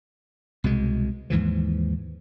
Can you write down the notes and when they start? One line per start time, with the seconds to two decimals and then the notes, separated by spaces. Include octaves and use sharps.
0.64 C2 B2 G#3
1.30 D#2 G#2 E3 F3